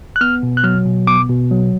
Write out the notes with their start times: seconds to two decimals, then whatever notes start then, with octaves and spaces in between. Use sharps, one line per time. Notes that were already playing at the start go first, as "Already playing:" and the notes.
0.16 F#6
0.21 B3 F6
0.43 B2
0.57 F#6
0.64 F#3 F6
0.86 B2
1.07 B3 D6
1.29 B2
1.51 F#3